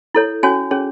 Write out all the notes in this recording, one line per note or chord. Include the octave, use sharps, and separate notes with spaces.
E4 A4 C#5
C#4 F#4 C#5 G#5
C#4 G#4 C#5